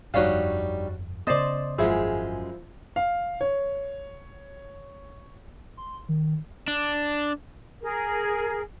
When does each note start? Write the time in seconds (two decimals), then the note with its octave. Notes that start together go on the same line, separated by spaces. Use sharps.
0.14 G1 F2 G3 D4 D#4 F#4 C#5 F5
1.27 C#3 B3 C5 D5 D#5 A5 C6
1.79 G#1 F#2 F3 G#3 E4 G#4
2.96 F5
3.41 C#5
5.77 C6
6.09 D#3
6.68 D4
7.82 G#4 A#4